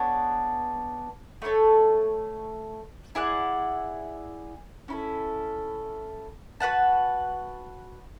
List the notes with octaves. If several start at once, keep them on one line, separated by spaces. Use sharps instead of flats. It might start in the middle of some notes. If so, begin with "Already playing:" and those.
Already playing: B3 D4 G#4 C#5
A3 E4 A4 C#5
E4 G#4 D5 F#5
C#4 E4 A4
F#4 B4 F#5 A5